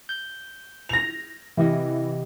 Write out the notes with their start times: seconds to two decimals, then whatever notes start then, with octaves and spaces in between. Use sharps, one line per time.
0.09 G6
0.89 A#6 F7
1.57 C3 E3 G4 D#5